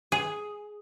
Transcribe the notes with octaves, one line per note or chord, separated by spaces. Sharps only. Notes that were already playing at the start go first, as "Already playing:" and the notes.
G#4